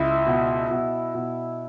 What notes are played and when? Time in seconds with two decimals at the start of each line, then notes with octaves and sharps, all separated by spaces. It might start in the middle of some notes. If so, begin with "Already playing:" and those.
Already playing: C#2 E4
0.26 B2
0.71 B2
1.15 B2